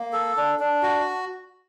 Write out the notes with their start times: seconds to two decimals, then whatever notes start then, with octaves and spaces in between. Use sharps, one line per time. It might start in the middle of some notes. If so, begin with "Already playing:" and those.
Already playing: A#3
0.13 A4
0.37 D4
0.59 D4
0.83 F#4